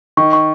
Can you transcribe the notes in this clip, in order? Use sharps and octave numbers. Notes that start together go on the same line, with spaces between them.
D#3 C#6
C#6